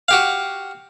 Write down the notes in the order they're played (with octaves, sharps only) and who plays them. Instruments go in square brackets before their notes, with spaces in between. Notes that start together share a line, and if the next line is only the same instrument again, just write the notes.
[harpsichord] F#4 G4 F5